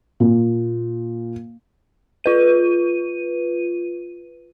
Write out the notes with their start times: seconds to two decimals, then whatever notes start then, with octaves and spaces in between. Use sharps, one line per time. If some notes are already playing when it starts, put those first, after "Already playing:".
0.20 A#2
2.24 F4 B4 D#7